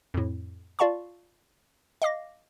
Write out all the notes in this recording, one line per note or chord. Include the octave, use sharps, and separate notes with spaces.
F2 A2
F4 D5 F5 A5 C#6
D#5 F5 D6 A#6